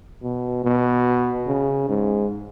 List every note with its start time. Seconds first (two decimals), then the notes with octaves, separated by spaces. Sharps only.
0.23 B2
0.64 B2
1.47 C#3
1.89 G#2